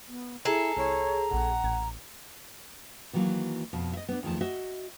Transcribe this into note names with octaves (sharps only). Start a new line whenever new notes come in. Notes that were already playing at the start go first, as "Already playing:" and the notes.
B3
E4 G#4 A4 A#5
C2 E4 C#5 C7
A#1 A#2 F#5
A1 G#6
D#3 E3 F#3 G3 A#3
F2 B2
D#5 E5
B3 D4
E2 D#3 F3 A3 A5
F#4 D#5 E5